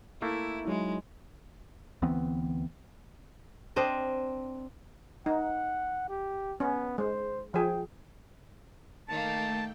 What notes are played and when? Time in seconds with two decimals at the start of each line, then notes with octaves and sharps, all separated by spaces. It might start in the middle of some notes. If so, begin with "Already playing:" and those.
0.22 A3 A#3 E4
0.68 F#3 G#3 D#4 E4
2.02 D2 E3 B3 C4
3.76 C4 D4 D#5
5.26 D#4 F#5
6.09 G4
6.60 B3 C#4
6.98 G#3 C5
7.54 F3 G#4 G5
9.08 D#3 A3 A#3 G5 A5